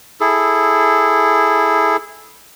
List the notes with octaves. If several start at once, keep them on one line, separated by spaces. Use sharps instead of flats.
E4 G#4 A4